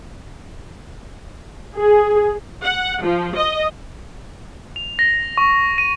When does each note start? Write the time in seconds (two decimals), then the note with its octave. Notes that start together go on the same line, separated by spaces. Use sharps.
1.75 G#4
2.62 F#5
3.03 F3
3.35 D#5
4.76 F7
4.99 A#6
5.38 C#6
5.78 D#7